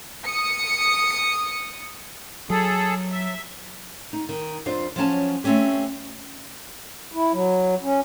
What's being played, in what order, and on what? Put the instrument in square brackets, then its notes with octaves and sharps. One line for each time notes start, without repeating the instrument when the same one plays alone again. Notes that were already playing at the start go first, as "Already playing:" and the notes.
[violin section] D#6 C#7
[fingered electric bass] F#3 [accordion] G#4 A4
[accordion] E5
[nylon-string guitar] D#4
D#3
F2 D4 F4 C5
F3 F#3 C#4 A5
A3 C4 C#4 G4
[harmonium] E4
F#3
C#4